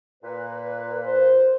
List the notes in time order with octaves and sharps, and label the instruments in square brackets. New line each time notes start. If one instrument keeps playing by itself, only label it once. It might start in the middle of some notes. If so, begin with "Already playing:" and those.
[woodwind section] A#2 B4
[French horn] C5